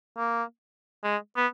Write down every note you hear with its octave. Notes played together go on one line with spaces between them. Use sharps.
A#3
G#3
B3